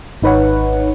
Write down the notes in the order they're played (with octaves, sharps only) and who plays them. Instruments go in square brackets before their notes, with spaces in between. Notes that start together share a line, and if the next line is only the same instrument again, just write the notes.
[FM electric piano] G#1 D#4 B4 C#5 F#5